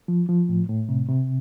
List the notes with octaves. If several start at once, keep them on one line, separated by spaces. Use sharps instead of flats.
F3
F3
A2
A2
C3
C3